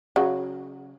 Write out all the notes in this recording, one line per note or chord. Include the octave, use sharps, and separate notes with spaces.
C#3 F#3